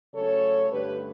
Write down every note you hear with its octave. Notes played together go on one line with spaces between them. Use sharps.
C#3 F#3 A3 C#4 A4 C#5
G2 D3 A3 C#4 G4 B4